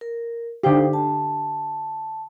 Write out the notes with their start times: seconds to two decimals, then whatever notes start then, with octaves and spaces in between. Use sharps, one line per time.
0.01 A#4
0.63 D3 D#4 G4 C5 F5
0.93 A5